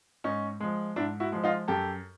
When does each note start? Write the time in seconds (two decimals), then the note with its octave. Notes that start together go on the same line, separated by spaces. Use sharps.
0.24 G#2 C#4 D#4
0.60 F3 G#3
0.96 G#2 D4 E4
1.20 E4 F#4
1.32 F3 G#3
1.44 D#4 F4
1.68 F#2 G4 A4